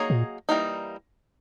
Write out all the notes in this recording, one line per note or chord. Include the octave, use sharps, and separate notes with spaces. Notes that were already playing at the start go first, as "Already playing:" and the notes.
Already playing: F#3 A#3 D#4 G#4 C#5
A#2
E3 G3 A#3 D#4